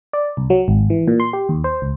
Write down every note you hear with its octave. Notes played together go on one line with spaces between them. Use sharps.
D5
C2
F#3
G#1
E3
A#2
C6
G4
D#2
C5
C#2